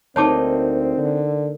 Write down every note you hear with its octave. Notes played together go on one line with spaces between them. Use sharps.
D2 A#3 C4 D#4 C#5 A5 D6
D3